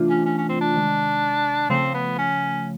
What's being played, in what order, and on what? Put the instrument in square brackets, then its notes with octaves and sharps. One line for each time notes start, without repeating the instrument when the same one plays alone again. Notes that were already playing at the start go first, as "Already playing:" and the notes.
Already playing: [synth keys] C3 E3 A3 D4 F4
[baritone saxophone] C#4
C#4
C#4
C4
D4
[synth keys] C3 D#3 G#3
[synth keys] C#3 F3 A3 [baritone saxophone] C4
[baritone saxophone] B3
C#4